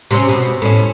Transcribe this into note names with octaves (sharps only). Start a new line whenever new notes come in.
C3 C4 C#4
B2
A2 C#4